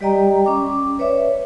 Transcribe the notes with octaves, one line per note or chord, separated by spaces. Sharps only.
G3 G4 D5 D#5 G5 A#5
C#4 D6
B4 C#5 D5 E5